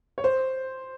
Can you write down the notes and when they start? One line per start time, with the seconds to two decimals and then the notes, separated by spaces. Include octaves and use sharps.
0.18 C#5
0.24 C5